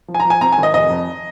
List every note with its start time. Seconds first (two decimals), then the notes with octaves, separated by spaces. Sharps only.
0.08 F3
0.14 G#5
0.20 A#5
0.25 F3
0.30 G#5
0.41 C4 A#5
0.52 G#5
0.58 G#1
0.63 D#5
0.74 F1 D#5
0.90 F2